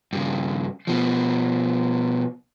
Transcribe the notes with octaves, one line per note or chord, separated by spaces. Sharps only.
G2 C#3
B2 F3